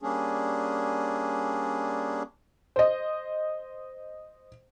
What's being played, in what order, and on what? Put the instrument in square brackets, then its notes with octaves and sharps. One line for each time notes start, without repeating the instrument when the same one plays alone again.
[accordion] G3 A#3 C#4 D4 G#4
[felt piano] C5 D#5